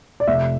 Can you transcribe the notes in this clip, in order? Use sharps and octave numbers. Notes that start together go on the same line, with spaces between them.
D5
F1 E5